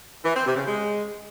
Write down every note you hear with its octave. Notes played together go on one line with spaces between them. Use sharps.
E3
C4
C3
C#3
G#3